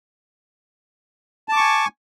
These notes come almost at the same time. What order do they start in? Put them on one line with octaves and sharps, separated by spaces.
A5 D6 C#6 G#5